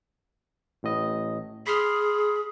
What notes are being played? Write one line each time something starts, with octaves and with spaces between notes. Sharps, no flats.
A1 A2 D#5
G#4 B5 C6 F6